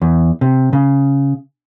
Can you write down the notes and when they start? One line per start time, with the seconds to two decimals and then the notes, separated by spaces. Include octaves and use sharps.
0.02 E2
0.41 C3
0.73 C#3